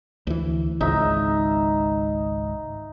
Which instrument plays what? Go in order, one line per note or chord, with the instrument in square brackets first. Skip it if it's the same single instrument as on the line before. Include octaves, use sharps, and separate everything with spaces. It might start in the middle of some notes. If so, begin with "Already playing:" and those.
[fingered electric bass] D2 E3
[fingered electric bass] G#1 C#2 G#2 [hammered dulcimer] D#4 E5